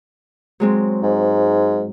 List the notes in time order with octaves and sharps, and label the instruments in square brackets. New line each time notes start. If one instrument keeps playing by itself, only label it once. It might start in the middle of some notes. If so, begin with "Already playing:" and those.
[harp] F#3 G#3 C4
[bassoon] G#2